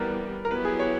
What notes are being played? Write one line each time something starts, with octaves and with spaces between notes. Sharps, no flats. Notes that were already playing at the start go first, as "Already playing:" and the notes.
Already playing: E3 G3 B3 A#4 B4
A#4
F#3 B3 E4 G4 B4
G#4
C#5